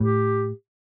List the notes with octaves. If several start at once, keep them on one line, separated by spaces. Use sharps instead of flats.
A2 G4